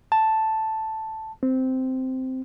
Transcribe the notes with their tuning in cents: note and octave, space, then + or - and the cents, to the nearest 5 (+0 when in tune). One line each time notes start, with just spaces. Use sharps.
A5 +0
C4 -10